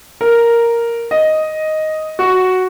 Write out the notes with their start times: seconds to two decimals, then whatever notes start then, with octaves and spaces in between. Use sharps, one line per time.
0.21 A#4
1.11 D#5
2.19 F#4